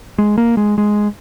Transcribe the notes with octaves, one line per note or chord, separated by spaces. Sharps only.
G#3
A#3
G#3
G#3